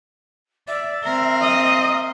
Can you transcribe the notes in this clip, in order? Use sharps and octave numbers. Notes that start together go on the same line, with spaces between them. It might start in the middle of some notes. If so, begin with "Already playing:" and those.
D5 E5
C4 A#4
D#5